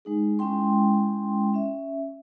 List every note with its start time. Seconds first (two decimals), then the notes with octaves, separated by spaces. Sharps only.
0.05 G#3 D#4 G#4
0.39 G#3 C#4 E4 G5 C6
1.54 C#4 E5